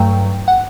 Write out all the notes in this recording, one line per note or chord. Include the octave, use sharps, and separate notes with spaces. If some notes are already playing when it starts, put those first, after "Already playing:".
Already playing: G2 F#3 A3 G5
F#5